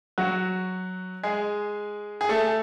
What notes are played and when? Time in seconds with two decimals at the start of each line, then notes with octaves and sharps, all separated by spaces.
0.18 F#3 F#4
1.23 G#3 G#4
2.21 G#4
2.29 A3 A4